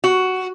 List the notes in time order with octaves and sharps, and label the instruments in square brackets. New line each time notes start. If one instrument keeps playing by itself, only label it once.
[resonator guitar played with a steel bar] F#4